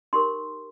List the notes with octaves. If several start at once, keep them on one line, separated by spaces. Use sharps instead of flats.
D#4 G4 A#4 C6